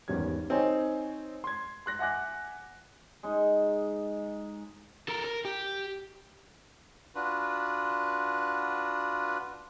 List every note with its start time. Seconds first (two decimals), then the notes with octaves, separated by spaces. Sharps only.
0.08 G#1 E2 G3 C#4 G#6
0.50 C4 D#4 A4 C5 C#5 G#5
1.44 C6 G#6
1.86 C6 F#6 A#6
1.99 E5 F#5 G#5 D6 F#6
3.23 G#3 D#4
5.08 A4 A#4
5.25 A#4
5.45 G4
7.15 D4 F4 F#4 B4